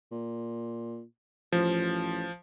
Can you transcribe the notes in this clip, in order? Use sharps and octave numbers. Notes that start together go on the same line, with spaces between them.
A#2
A1 F3